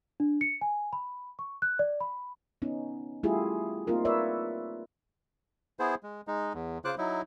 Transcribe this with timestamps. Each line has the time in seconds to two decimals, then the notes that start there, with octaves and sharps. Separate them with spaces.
0.20 D4
0.41 C#7
0.61 G#5
0.93 B5
1.39 C#6
1.62 F#6
1.79 D5
2.00 B5
2.62 B3 C#4 D#4
3.23 G3 A3 E4 F4 G4 G#4
3.87 A#3 C4 D#4 F4 A#4
4.05 A#4 B4 C#5 D5 E5
5.80 B3 E4 G#4 C5
6.03 G#3
6.28 G#3 D#4
6.54 E2
6.85 C#3 F4 C5 D6 F#6
6.98 F#3 D#4 E4